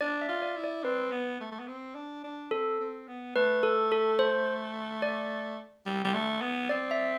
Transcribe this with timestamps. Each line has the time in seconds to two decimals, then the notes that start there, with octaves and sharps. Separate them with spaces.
0.01 D4 D5
0.22 E5
0.29 F4
0.42 D5
0.57 E4
0.64 D5
0.84 C4 B4
1.12 B3
1.41 A3
1.52 A3
1.60 B3
1.68 C4
1.95 D4
2.24 D4
2.51 C4 A4
2.80 C4
3.08 B3
3.36 A3 B4
3.63 A4
3.92 A4
4.19 C5
5.02 D5
5.86 G3
6.05 G3
6.14 A3
6.42 B3
6.69 C4 D5
6.91 E5